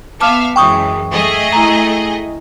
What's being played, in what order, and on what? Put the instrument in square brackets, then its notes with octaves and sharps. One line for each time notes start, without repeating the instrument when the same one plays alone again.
[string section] B3 E5 F5 [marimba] A5 D6 F6
[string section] F#2 E3 G#3 [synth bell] G5 C#6 D#6
[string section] A3 G#4 D#5
[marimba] E4 A#5